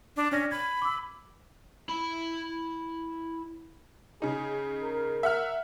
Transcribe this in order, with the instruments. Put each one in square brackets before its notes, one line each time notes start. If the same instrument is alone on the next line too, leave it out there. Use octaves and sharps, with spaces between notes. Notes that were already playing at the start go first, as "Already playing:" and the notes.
[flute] D4
[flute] C#4 [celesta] D4 D5 A#6
[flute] B5 [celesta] G#6
[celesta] D6 E6
[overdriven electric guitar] E4 B5
[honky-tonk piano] C#3 D#4 [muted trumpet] G#4
[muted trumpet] A#4
[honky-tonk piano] E5 F#5 F6